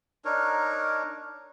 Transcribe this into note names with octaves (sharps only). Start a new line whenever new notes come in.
D4 D#4 A#4 C#5